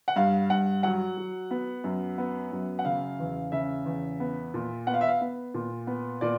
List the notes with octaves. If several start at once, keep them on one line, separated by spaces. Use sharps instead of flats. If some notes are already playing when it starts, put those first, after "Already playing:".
F#5
G2 F5
G2 F#5
F#3 F#5
F#3
B3
F#2
B3
F#2
F#5
C#3 F5
E2
C#3 E5
E2
B3
A#2
B3 F#5
F5
E5
F5
B3
A#2
B3
A#2 D5